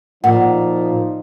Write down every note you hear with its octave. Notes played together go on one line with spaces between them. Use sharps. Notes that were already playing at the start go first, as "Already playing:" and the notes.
A#2 F3 D#4 F#5